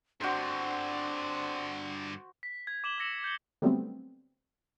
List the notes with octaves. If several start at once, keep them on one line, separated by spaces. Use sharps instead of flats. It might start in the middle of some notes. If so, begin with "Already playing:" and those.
G2 D3 C4 D4 F#4 C5
B6
G#6
D6 E7 F#7 G7
D6 E6 A#6 C#7 E7 F#7
G6 C#7 G7
D3 F#3 G3 A3 B3 C4